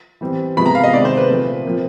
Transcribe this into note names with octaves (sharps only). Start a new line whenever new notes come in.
E3 G3 C4
C3 F3 G#3 B3 B5
A#5
F5
D#5
C3 D#3 G#3 C4 D5
C5
B4
A#2 F3 A3 C4
C3 F3 A#3